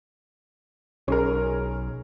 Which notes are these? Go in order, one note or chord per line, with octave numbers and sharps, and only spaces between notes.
B1 C#4 G#4 A#4